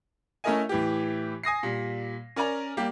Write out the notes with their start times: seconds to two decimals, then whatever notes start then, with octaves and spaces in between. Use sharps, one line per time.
0.44 A3 C#4 E4 A#4 D#5 G#5
0.69 A2 E3 G4
1.43 G#5 D#6 A#6 C7
1.63 A#2 G3
2.36 C#4 A#4 D5 G#5 A#5
2.77 G3 A#3 G4